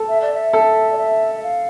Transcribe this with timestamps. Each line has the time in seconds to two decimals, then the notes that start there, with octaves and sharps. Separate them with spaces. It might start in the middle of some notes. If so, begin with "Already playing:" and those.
Already playing: A4
0.09 E5
0.22 D5
0.34 E5
0.53 A4
0.92 D5
0.98 E5
1.35 E5
1.43 F5